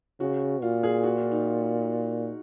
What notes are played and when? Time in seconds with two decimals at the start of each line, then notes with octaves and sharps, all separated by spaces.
0.20 C#3 F#4
0.62 A#2 F4
0.83 G#4
1.03 F#4
1.18 F4
1.32 D#4